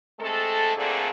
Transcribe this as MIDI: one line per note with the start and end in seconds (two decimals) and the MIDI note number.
0.19 0.75 56
0.19 0.75 57
0.19 0.75 60
0.19 0.75 69
0.75 1.09 46
0.75 1.09 50
0.75 1.09 57
0.75 1.09 60
0.75 1.09 68
0.75 1.09 69